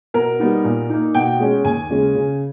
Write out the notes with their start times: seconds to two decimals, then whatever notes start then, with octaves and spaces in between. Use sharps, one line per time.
0.14 B2 A#4
0.40 G3 B3 D#4
0.64 A#2
0.90 A#3 D#4
1.15 B2 G5
1.40 G#3 C#4
1.65 D#2 G#5
1.90 C#3 G#3 C#4
2.15 C#3